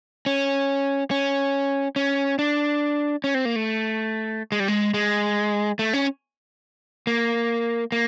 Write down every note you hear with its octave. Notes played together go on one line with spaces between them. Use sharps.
C#4
C#4
C#4
D4
C#4
C4
A#3
A3
G#3
G3
G#3
G#3
A3
C#4
A#3
A#3